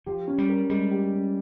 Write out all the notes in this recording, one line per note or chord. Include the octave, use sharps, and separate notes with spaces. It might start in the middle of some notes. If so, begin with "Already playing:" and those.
F3 G4
C#4
G3
A#4
G3 G#3
G4
C#4